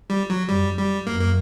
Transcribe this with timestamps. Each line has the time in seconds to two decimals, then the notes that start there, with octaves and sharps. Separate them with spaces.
0.10 G3
0.30 F#3
0.49 F#2 G3
0.78 G3
1.06 F#2 A#3
1.21 A#3